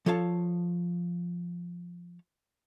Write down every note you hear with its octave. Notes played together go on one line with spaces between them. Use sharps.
F3 A4 C#5 F5 A5